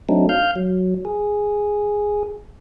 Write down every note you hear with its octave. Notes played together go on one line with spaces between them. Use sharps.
F#3 A3 C4 D4 D#4
F5 F6 G6
F#3
G#4